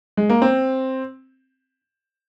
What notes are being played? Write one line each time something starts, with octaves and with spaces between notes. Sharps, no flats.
G#3
A#3
C4